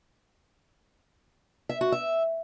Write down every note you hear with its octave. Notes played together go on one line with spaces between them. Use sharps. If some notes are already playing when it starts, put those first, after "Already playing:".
E5
F#4
E5